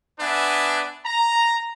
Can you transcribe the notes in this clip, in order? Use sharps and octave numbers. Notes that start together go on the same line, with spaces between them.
B3 D4 B4 E5 G#5
A#5